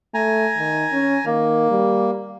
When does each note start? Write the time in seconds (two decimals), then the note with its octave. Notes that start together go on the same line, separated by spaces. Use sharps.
0.14 A3 G#5 A#5
0.58 D#3
0.92 C#4
1.26 D#3 A#3
1.70 G3